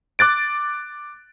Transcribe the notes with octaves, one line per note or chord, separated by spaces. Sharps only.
D6 F#6 A6 D7